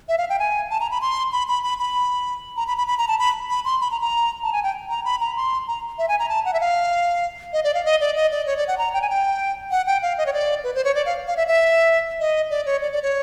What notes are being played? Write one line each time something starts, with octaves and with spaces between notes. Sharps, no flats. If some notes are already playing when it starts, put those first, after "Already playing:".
E5
F5
G5
G#5
A5
A#5
B5
C6
B5
B5
B5
B5
A#5
B5
B5
B5
A#5
A5
B5
B5
C6
B5
A#5
A#5
A5
G#5
G5
A#5
B5
A#5
C6
A#5
E5
G#5
A#5
A5
F#5
E5
F5
D#5
D5
F5
D#5
D5
D#5
D5
C#5
D5
F#5
A#5
G5
G#5
G5
F#5
G5
F5
D#5
C#5
D5
B4
C5
C#5
D5
F5
F5
E5
E5
D#5
D5
C#5
D5
D5
C#5